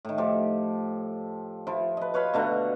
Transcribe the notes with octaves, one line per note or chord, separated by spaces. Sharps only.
A2 D#3
F3 G4 A4
F3 E4
B4 D#5
B4 C#5 F5 B5
B2 D3 A3 A#5